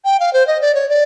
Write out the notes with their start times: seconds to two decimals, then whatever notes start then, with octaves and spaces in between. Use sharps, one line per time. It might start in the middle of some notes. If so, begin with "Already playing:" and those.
0.05 G5
0.20 F5
0.33 C5
0.47 D#5
0.61 D5
0.75 C#5
0.89 D5